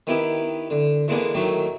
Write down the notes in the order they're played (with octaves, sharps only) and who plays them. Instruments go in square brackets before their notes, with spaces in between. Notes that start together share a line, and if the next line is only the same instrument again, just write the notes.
[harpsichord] D#3 B3 E4 G4
D3
E3 G#3 A#3 B3 D4
A2 D#3 F#3 A3